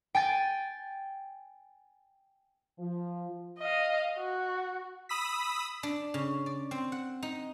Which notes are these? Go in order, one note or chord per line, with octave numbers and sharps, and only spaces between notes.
G5 G#5 A6
F3
D#5 F5
F#4
B5 D#6 E6 B6
D4
C#3
D5
C4
F#5
D#4